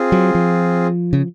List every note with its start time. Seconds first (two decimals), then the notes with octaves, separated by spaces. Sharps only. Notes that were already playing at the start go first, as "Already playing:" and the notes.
Already playing: C4 F4 G#4
0.12 F#3
0.35 F3
1.13 C#3